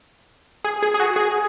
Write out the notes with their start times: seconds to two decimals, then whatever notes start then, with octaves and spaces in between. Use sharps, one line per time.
0.64 G#4
0.83 G#4
0.94 G#4
1.00 F#4
1.16 G#4